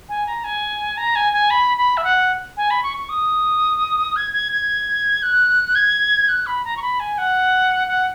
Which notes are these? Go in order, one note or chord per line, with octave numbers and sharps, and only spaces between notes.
G#5
A#5
G#5
A#5
G#5
G#5
B5
B5
E5
F#5
G#5
B5
C#6
C#6
D#6
G#6
G#6
G#6
F#6
G#6
F#6
B5
A#5
C#6
B5
G#5
F#5
F#5